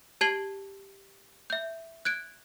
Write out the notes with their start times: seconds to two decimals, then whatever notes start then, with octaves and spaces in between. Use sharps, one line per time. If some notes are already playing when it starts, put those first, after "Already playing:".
0.21 G4 A5 G#6 C7 F#7 G7
1.50 E5 G6
2.05 F#6 G#6 D7